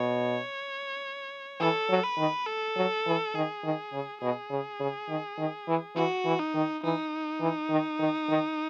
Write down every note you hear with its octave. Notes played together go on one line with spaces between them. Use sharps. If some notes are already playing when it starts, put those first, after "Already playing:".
Already playing: B2 C#5
E3 A4
F#3
B4
D#3
A4
F#3
E3
D#3 G#4
D#3
C#3
B2 G#4
C#3
C#3
D#3
D#3
E3
E3 F#4
E3
D#4
D#3
E3 D#4
E3
D#3
D#3
D#3